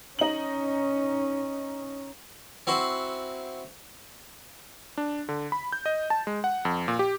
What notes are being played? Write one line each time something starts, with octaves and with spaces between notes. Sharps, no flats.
C#4 D#4 F#7
C4 E4 F#4 C5
D4
D3
B5
G6
D#5
A5
G#3
F#5
F2
A#2
G4